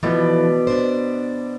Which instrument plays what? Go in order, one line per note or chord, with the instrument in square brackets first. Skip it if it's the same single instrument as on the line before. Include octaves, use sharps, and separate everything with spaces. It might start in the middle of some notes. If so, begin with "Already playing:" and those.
[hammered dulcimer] B2 D5 [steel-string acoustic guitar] E3 F3 A3
[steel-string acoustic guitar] D4 C5